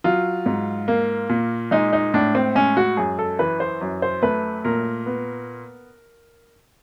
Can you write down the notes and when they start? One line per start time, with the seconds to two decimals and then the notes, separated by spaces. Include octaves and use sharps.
0.04 F#3 F4
0.46 G#2
0.88 A#3
1.29 A#2
1.71 G#3 D#4
1.93 D#4
2.14 A2 D4
2.35 C4
2.55 G#3 C#4
2.77 F#4
2.97 F#2 G#4
3.19 A4
3.39 E3 B4
3.60 C5
3.81 F#2
4.02 C5
4.23 A3 B4
4.64 A#2 A#4
5.06 B3